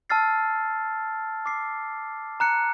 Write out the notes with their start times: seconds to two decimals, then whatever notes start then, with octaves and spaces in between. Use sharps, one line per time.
0.10 A5 E6 F6 A6 C7
1.46 D6 C7
2.40 A#5 F#6 C#7